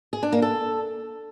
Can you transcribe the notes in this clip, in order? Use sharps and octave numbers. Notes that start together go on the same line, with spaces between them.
G#4
D4
A#3
A4